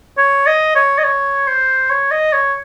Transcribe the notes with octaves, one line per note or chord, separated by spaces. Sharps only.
C#5
D#5
C#5
D#5
C#5
C5
C#5
D#5
C#5